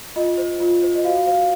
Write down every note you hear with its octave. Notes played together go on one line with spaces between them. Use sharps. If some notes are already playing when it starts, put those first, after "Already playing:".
F4 D#5
C5
F4
C5
D#5
F#4 F5
C5 F5